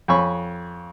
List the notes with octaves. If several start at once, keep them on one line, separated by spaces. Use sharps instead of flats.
F2 C#5 G#5 B5 C#6